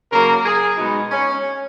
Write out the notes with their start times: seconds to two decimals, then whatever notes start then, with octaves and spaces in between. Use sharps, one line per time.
0.12 C#3 F#3 A#3 A#4
0.45 G#4
0.78 B2 G#3 B3 D#4
1.12 C#4